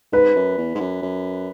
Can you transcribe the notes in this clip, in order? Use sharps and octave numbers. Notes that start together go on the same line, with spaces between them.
G#2 B4
F#2
E2
G#2
F#2
F#2